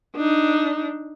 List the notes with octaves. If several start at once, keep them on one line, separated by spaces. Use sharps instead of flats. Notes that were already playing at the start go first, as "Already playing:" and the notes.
D4 D#4